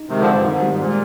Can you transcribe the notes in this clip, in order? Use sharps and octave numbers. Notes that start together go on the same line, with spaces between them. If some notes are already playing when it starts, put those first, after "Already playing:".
Already playing: D#4
C3 D#3 G#3
D3 F3
C4
G2
G#2 D#3
G3
G#2
A#2 G#3